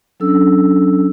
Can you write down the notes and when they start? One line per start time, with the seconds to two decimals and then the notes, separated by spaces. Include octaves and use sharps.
0.20 F#3 C#4 D4 A4 E6